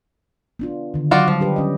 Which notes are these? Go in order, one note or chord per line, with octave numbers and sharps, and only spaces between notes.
B3 D4 F4
D3 D#3
F#3 F4 F#4 D5
F3 G3
D4 G4 B4
C#4 D#5